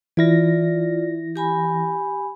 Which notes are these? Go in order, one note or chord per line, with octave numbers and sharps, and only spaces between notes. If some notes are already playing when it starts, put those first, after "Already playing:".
E3 E4 F4 D5 A#6
G4 G#5 B5